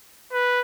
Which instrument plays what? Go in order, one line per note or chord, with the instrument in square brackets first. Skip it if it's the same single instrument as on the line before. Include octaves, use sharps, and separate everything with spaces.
[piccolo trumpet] B4